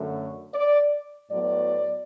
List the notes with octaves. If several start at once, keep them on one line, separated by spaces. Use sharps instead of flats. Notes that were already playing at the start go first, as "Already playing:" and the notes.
Already playing: F#2 D3 A3
D5
A2 F#3 B3 D5